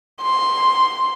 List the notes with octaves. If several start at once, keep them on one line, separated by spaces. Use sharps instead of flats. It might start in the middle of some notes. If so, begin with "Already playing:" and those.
C6